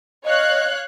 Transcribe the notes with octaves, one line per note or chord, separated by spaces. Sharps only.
C#5 D#5 F5 F#6